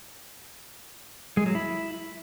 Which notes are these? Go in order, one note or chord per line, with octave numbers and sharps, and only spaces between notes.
G#3
F#3
E4